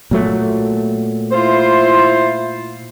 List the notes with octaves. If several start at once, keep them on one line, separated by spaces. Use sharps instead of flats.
A#2 F#3 A3
E4 F4 C5